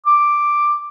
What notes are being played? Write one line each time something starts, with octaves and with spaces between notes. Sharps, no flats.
D6